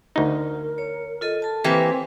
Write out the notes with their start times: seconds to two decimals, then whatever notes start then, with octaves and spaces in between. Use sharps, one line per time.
0.16 D2 D#4 A#4
0.78 C#5
1.21 F4 A4 D#5
1.42 A4 A5
1.64 E3 A#3 C4 G4 B4 G#5